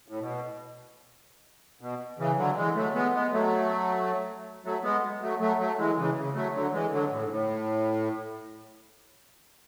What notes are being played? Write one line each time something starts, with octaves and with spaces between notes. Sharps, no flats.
A2
B2
B2
C#3 E3
D3 F#3
E3 G#3
F#3 A3
G#3 B3
G#3 B3
F#3 A3
F#3 A3
G#3 B3
F#3 A3
F#3 A3
F#3 A3
E3 G#3
C#3 E3
C#3
F#3 A3
D3 F#3
E3 G#3
D3 F#3
A2
G#2
A2